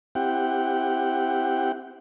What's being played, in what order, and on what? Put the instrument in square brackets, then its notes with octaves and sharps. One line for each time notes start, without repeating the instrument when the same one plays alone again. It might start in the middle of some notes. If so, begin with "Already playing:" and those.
[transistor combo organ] C4 E4 G4 F#5 G5